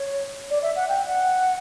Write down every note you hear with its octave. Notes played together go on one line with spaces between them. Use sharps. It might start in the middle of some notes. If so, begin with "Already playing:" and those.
Already playing: C#5
D5
E5
F#5
G5
F#5